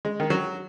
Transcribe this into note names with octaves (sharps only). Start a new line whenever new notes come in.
G#3
D#3
F#3